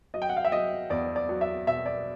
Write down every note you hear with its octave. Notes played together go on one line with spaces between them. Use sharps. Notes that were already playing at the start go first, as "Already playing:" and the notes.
F#3 D#5
G5
F#5
F5
E5
F#3 D#5
E2 D5
D5
F#3
E5
B2 E5
D5